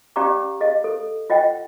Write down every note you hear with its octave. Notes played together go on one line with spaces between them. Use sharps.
C#4 G4 D5 F5 A#5 D6
G#4 D#5 F5
A4
F4 D#5 F#5 G5